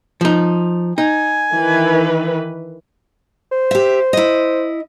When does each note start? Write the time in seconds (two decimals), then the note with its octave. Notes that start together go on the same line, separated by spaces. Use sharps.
0.21 F3 D#4
0.98 D#4 G#5
1.54 D#3 E3 B4
3.52 C5
3.71 G4 E5
4.13 E4 D#5